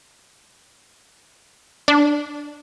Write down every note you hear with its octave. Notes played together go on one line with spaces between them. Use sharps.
D4